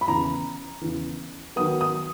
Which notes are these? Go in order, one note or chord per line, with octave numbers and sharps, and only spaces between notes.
B5
E2 C#3 E3 A#5
E2 C#3 E3
D#3 F#3 B3 D#6
D#6